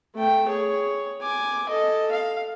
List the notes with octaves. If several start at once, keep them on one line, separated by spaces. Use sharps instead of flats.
A3 G5
G#4 C#5
G#5 D6
A4 D#5
F5